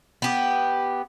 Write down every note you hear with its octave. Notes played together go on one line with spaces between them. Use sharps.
B3 G4